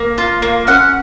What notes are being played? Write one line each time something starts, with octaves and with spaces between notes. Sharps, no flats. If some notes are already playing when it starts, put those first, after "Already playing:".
Already playing: A#3
F4
A#3
C#4 F#5